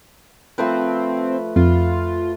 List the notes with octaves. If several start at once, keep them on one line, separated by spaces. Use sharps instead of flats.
F3 A3 C4 B4
F2 F4